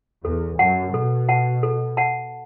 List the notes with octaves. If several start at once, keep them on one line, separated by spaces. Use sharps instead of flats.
E2 A4
F#2 F#5 A5
B2 A4
F#5 A5
A4
F#5 A5